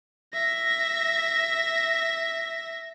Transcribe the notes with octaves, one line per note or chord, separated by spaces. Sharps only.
E5 A#6